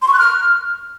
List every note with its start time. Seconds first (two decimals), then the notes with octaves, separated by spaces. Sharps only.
0.02 C6
0.08 C#6
0.13 F#6
0.19 F6